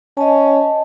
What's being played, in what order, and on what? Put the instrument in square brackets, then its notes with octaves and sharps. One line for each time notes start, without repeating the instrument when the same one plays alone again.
[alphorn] C#4 [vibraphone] D#5 A5